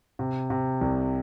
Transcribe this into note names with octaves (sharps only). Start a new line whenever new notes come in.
C3
C3
C2